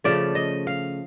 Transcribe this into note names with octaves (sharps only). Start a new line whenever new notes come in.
C#3 F3 A3 D5
D#5
F5